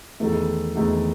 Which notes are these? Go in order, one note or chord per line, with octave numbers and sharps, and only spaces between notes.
E2 D#3 A3 A4
E2 D#3 A3